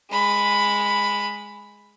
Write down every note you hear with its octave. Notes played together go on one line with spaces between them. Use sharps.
G#3 B5